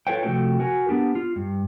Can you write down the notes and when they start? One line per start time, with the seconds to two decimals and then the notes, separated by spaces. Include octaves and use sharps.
0.07 F4 A4 B4 C#5 F5 G5
0.23 C3 F3 A3 D4 F#4 G5
0.59 F#4 A#4 G#5
0.89 B3 D4 G4
1.15 F4
1.36 G2